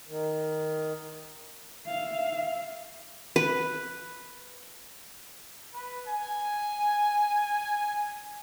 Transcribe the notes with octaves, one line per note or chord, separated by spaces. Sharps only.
D#3
E5 F5
B4
B4
G#5